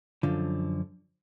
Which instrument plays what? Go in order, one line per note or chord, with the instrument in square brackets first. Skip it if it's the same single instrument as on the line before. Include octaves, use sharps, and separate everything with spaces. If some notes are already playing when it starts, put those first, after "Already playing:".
[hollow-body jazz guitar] F#2 D3 F3